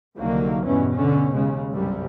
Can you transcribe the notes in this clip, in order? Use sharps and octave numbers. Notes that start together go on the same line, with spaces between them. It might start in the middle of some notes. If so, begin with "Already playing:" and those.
C2 D3 D#3 F#3 A#3
E2 G2 B2 E3 C#4
B2 D3 C#4
D#2 C#3 G#3
G1 C2 F#2 C3 G3